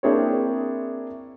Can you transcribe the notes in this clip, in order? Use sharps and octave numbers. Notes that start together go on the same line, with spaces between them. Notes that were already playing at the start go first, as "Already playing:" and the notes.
A#3 C4 D4 E4 G#4 C#5